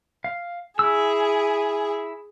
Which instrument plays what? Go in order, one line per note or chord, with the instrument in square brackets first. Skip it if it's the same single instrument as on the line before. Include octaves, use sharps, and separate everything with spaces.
[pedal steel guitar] F5
[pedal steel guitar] E4 E6 [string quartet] G#4